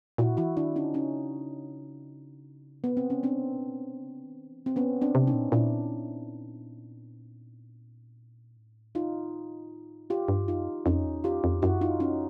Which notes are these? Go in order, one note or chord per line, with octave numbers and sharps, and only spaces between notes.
A#2 E4 F#4
E3 E4 F#4
D#3 D4 E4
D3 C#4 D#4
C#3 C#4 D#4
B3
C4
C#4
C3 C4 D4
A#2
B2
C#3
D#3
E3
C4
D3 B3 C#4
C4 D4
C3
C#4 D#4
A#2
A#2 D4 E4
A2
D#4 F4
G#2 F4 G4
G2
F#2 D#4 F4
F2 C#4 D#4
E2
F2 F4 G4
F2
F#2 E4 F#4
D#4 F4
C#4 D#4